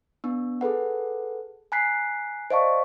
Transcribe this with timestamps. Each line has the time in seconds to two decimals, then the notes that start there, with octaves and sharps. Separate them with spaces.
0.24 B3 D4
0.61 G#4 A4 B4 F#5
1.72 G#5 A#5 F#6 B6 C7
2.50 C5 D5 D#5 F5 A5 C#6